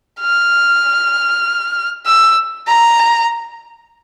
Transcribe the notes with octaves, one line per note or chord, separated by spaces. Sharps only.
F6
E6
A#5